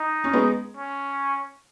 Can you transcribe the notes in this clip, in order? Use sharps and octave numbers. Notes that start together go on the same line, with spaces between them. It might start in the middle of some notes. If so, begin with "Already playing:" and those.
Already playing: D#4
C#4
G#3 B3
C#4